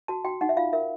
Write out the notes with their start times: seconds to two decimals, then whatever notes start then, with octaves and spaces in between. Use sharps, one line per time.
0.08 F#4 A5
0.25 F#4 G5
0.41 D#4 F#5
0.49 E5
0.57 F4 F5
0.73 A#4 E5